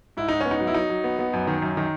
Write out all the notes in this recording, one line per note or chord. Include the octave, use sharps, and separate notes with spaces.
G#2 E4
G#2 D#4
C#4
B3
D#4
F#3
E4
F#3 D#4
F#3
B3
B3
F#2
D#3
F#2
D#3